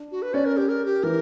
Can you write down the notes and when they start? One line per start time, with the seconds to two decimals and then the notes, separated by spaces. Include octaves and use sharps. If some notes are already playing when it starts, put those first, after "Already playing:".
Already playing: D4
0.12 F#4
0.22 B4
0.34 C#4 D5
0.45 A#4
0.57 G4
0.69 A#4
0.85 G4
1.03 E3 A#4